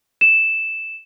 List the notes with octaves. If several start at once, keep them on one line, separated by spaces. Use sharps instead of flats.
E7